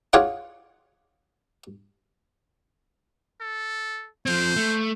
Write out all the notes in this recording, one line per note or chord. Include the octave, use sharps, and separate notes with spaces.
F4 G#4 C#5 F#5 D6
A4
F3 C4 C5
A3